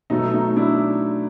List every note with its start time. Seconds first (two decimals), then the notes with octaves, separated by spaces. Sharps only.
0.10 B2 F#3 A3 D#4
0.34 D#4
0.56 D4 E4